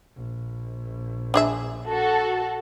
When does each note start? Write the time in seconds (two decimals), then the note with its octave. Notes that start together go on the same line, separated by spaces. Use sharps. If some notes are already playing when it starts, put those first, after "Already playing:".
0.16 A#1
1.34 D4 G#4 E5
1.88 F#4 A4